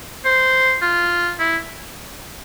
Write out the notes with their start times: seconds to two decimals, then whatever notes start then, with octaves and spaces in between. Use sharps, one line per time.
0.25 C5
0.82 F4
1.39 E4